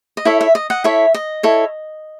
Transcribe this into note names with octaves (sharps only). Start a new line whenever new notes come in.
D#5
E4 A4 C#5 E5
E5
D#5
D#5 F#5
E4 A4 C#5 E5
D#5
E4 A4 C#5